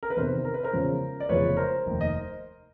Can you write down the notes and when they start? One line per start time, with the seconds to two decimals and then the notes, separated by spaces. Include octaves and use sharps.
0.03 A#4
0.10 B4
0.17 E2 C3 D#3 A#4 C5
0.45 A#4
0.54 B4
0.63 A#4 C5
0.73 E2 C#3 F3 G#3 C#4
1.20 D5
1.29 F1 E2 C#3 F3 G#3 B4 C#5
1.57 A#4 C5
1.86 F1 D#2 D#3
2.01 D#5